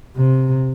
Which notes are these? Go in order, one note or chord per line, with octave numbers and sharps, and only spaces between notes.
C3